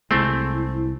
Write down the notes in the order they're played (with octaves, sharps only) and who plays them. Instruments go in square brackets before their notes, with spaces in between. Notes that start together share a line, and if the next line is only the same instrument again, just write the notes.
[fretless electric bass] C2 G#3 [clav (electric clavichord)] A3 C4 [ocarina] E4